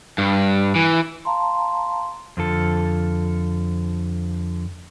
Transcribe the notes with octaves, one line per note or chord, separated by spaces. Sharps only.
G2
E3
F5 A5 A#5 C6
F2 D3 F4 A4